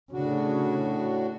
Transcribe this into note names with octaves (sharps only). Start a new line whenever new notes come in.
A2 C#3 D4 F#4